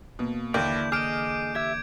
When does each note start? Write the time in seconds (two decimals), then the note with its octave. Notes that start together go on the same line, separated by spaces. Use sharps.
0.19 B2 A#3
0.54 D#2 D3 E3 E4 D5 G6
0.92 G#4 D#5 D6 F6 D7
1.55 G4 E5 E6 G#6